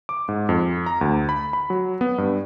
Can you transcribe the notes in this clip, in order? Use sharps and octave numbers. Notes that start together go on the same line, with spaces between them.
D6
G#2
F2
A#5
D2
B5
B5
F#3
B3
G2